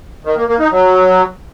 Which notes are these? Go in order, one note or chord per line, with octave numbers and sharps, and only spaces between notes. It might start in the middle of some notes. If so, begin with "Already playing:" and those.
D#3
A#3
A#3
D#4
F#3